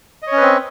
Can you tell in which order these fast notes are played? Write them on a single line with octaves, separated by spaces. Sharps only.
D#5 C#5 C#4 B4 C4